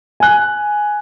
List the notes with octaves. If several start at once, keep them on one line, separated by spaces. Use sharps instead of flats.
G#5 F#6